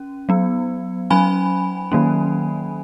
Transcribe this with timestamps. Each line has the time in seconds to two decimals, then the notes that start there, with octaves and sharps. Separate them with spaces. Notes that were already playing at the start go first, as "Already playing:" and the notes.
Already playing: C#4
0.29 F#3 B3
1.10 F#3 C#4 G#5 B5
1.92 D#3 F#3 A#3 C#4